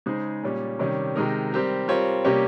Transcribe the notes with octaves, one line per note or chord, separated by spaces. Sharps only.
C#3 G#3 D#4 G#4 C5
A#2 G3 C#4
C3 D#3 G3 C#4
C3 D#3 G#3 D#4 A#4
G3 C4 G4 A#4
G3 C4 F4 A#4 C#5
C3 G3 A#3 C#4 G4